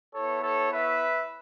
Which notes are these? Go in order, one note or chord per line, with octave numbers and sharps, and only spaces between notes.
B3 E4 A4 C#5
A4 C#5
B4 E5